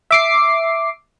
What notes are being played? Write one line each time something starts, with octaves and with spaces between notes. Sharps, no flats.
E5 D6 C7